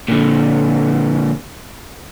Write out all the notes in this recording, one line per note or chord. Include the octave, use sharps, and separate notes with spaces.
A#2 D3